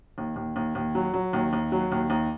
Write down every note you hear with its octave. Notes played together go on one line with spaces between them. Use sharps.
D#2
D#2
D#2
D#2
F#3
F#3
D#2
D#2
F#3
D#2
D#2